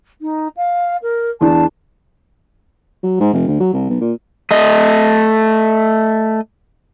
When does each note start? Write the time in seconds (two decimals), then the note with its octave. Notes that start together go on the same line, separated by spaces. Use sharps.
0.21 D#4
0.57 F5
1.02 A#4
1.41 E2 D4 A5
3.03 F#3
3.20 G#2
3.33 F1
3.48 D2
3.60 F#3
3.73 C2
3.89 B1
4.01 A#2
4.51 A3 D#5